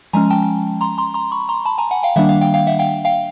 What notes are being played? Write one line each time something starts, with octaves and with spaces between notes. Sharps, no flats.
F3 G#3 C#4 G#5 A#5
G5 A5
A#5 C6
A#5 C6
A#5 C6
B5 C#6
A#5 C6
A5 B5
G#5 A#5
F#5 G#5
F5 G5
D#3 G3 A#3 D4 E5 F#5
F5
F5 G5
F5 G5
E5 F#5
F5 G5
F5 G5